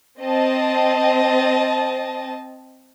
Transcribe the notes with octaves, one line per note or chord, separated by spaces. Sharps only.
C4 D#5 A5